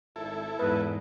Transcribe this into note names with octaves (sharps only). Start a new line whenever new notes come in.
G#1 E4 A4
E2 G#2 B4